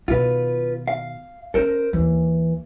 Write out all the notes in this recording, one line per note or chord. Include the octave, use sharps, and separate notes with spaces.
B2 D#3 F4 B4
F5
C#4 A4 A#4 C5
D#2 E3